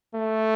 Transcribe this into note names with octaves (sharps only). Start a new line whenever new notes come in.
A3